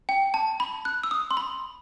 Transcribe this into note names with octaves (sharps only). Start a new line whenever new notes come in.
G5
A5
B5
F#6
E6
D#6
C6
B5